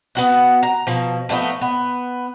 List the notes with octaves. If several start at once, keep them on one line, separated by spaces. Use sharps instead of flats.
B3 F#4 F#5
A#5
B2 F3
F3 A3 B3 D#4
B3